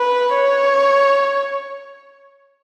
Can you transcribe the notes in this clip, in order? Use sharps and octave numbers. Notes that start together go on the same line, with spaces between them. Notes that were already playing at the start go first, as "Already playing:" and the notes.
Already playing: B4
C#5